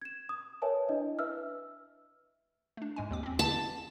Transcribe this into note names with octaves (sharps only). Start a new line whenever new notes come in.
G#6 E7
D#6
A#4 B4 C#5 E5 G#5 A5
D4 E4 D#5
B4 E5 E6 F6
A3 D4
G#2 G#3 G#5
D#2 C4 D6
C4 C#4
A5